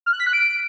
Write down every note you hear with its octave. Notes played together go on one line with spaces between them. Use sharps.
F6
F#6
B6
F#6
D7